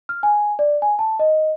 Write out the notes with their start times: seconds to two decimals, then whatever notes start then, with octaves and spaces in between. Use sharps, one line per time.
0.09 F6
0.23 G#5
0.59 D5
0.82 G#5
0.99 A5
1.19 D#5